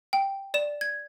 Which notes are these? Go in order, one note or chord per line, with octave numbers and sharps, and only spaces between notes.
G5
D5 E7
G#6